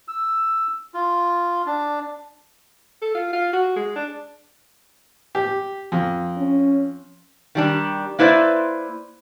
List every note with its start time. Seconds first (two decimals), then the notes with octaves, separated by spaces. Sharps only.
0.08 E6
0.94 F4
1.66 D4
3.02 A4
3.15 F4
3.33 F4
3.53 F#4
3.76 G#3
3.96 D4
5.35 G4
5.92 F2
6.38 C#4
7.55 D#3 G3 D4
8.19 A#3 E4 B4 C5 D5 E5